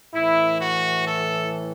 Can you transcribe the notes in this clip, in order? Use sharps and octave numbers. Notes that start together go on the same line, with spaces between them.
A2 E3 E4
F#4
A4